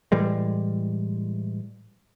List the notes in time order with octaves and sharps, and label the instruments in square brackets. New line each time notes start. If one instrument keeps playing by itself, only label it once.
[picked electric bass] A2 E3 G3 G#3